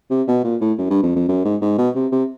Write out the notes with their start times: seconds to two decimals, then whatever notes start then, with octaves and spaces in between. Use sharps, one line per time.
0.11 C3
0.28 B2
0.44 A#2
0.61 A2
0.78 F#2
0.90 G2
1.03 F2
1.16 F2
1.28 F#2
1.45 G#2
1.62 G#2
1.78 B2
1.95 C3
2.12 C3